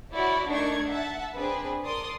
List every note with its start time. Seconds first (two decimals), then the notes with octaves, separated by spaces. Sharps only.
0.12 E4 F#4 C#5 D5
0.49 A3 D4 D#4 A#4 C#6 G#6
0.87 E5 F#5 A5
1.34 C4 D4 G#4 B4
1.84 A#4 D5 A5 C6 D#6